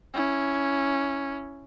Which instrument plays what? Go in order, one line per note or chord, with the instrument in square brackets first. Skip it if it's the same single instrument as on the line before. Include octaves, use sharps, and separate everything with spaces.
[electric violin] C#4 E4